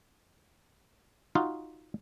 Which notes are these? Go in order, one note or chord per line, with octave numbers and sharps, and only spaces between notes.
D#4 F4 F#4 F5